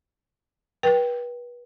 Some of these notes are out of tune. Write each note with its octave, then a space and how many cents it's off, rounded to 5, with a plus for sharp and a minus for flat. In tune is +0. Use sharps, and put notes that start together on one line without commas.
B4 -30 G5 +0